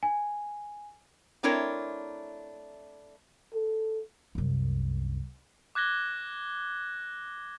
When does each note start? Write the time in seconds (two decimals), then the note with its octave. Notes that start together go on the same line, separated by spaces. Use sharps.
0.03 G#5
1.43 A3 C4 D4 E4 A#4 C#5
3.54 A4
4.35 C2 F#2
5.75 D6 F#6 G#6 A#6 G7